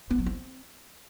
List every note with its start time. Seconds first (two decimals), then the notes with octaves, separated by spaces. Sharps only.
0.11 B3
0.18 F#3
0.26 C4